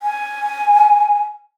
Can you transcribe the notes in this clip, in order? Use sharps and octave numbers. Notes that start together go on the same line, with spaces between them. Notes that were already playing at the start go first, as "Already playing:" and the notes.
G#5